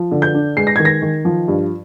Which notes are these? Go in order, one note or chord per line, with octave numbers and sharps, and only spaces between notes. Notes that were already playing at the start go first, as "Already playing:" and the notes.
Already playing: F3
D3
G6
D4
G#3 C7
A#6
D#3 G#6
A#6
D#3
F3
G2